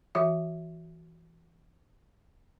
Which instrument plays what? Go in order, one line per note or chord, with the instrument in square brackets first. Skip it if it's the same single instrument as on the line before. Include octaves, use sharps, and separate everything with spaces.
[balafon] E3 F#4 E5